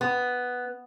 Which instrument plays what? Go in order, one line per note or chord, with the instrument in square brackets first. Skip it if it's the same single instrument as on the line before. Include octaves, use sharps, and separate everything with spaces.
[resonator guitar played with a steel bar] B3